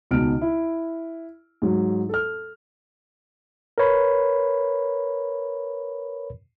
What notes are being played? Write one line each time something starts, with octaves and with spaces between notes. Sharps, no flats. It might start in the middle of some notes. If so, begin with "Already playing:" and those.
C#2 B2 D#3 F6 D7
E4
G#2 F#3
A4 F6
A#4 B4 C#5 B5